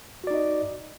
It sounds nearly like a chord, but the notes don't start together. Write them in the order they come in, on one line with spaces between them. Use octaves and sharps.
F#4 D5 D#4 D#5